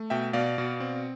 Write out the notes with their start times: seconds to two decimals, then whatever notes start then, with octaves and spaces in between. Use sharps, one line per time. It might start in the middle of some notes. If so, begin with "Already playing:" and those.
Already playing: A3
0.10 B2 E5 G5
0.33 B2 D5 F5
0.58 B2
0.80 C4